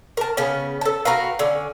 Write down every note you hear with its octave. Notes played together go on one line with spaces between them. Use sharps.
A#4 A5
C#3 B3 C#4
A4 A5
F#4 A#4 B4 F5
D3 C#4